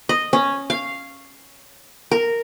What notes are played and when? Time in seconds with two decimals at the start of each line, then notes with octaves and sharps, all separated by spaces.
0.09 D#5
0.33 C#4
0.70 F5
2.11 A#4